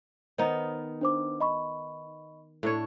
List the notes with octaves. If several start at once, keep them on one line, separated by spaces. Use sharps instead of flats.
D#3 B3 D#4 C5
D4 C5 D6
D#5 B5 C#6
A2 D4 C#5